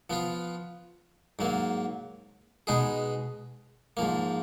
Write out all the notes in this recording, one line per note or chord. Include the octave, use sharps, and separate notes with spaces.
F3 B3 F4
G#2 F#3 A#3
B2 G#3 B3 D#4 G#4
G#2 F3 A#3